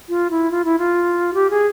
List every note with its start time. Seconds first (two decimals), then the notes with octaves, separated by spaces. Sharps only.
0.09 F4
0.31 E4
0.51 F4
0.65 E4
0.79 F4
1.34 G4
1.50 G#4